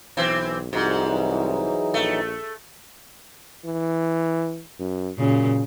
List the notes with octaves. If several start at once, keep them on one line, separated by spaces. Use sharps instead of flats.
B1 E3 C4
C2 G#2 F3 D#4 F#4
E3 F#3 D#4
A#1 A3
E3
F#2
F#2 A#2 C#3